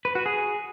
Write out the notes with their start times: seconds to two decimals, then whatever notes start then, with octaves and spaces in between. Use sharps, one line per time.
0.05 B4
0.15 F#4
0.26 G#4